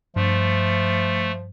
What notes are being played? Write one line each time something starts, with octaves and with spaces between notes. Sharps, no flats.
G2 F3 A3